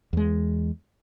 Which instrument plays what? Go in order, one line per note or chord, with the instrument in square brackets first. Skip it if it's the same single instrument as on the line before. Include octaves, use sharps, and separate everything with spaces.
[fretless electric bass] E2 G#3